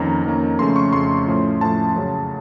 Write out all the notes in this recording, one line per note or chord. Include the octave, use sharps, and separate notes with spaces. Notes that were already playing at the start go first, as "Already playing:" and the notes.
Already playing: F2 D#3 A#3 C#4 A#5
F2 D#3 A#3 C#4
F2 C#3 A3 C#4 C6
C#6
F2 C#3 A3 C#4 C6
A2 F3 A3 C#4
A2 F3 A3 C#4 A5
F#2 C#3 F#3